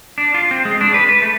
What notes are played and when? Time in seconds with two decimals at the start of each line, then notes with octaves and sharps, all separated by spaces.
0.18 D4
0.34 F4
0.51 C4
0.65 G#3
0.81 D4
0.94 B4
1.09 B4
1.22 A3